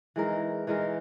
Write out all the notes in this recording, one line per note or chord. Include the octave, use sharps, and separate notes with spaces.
E3 G#3 D#4 A#4
E3 G#3 D#4 A#4